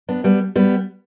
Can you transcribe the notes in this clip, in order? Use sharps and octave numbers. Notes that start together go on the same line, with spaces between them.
B3 D4
G3 B3
G3 B3